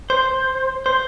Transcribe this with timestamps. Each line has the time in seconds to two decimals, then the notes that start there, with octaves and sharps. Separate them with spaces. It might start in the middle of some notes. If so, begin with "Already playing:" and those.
0.10 C5
0.86 C5